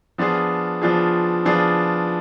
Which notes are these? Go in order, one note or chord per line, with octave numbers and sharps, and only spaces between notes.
F3 B3 D4 F4 G#4
F3 B3 D4 F4 G#4
F3 B3 D4 F4 G#4